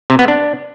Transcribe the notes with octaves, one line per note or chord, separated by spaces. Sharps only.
C3
B3
D4